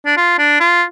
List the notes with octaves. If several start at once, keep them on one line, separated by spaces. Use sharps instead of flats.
D4
F4
D4
F4